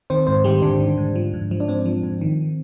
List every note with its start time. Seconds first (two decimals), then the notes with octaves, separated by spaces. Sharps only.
0.10 D#3 C4 C5
0.27 G#2 C4 C5
0.44 D#3 G3 G4
0.62 G#2 D3 D4
0.80 D#3
0.97 G#2
1.16 F3
1.34 G#2
1.51 F3
1.60 D4
1.68 G#2 C4
1.86 F3
2.03 G#2
2.21 D#3